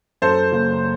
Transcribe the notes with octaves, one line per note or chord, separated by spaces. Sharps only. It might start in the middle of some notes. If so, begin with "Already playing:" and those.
F#2 A4 C5
F#1